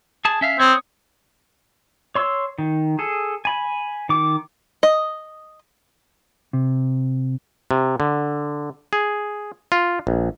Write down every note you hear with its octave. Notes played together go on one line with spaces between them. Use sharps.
G#4 A5
C#4 E5 F5
C4 C#5 D#6
C#5 C6 E6
D#3
G#4 A4
G#5 B5
D#3 D6
D#5
C3
C3
D3
G#4
F4
A#1